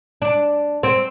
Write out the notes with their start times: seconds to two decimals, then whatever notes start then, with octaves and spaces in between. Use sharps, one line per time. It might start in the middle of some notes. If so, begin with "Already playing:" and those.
0.22 D4
0.83 C4